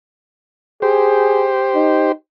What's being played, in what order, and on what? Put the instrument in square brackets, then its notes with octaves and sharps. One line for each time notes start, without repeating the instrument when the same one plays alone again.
[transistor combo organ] G4 C5 [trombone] G#4
[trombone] D#4